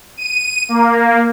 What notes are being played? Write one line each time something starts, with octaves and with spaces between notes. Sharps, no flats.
D#7
A#3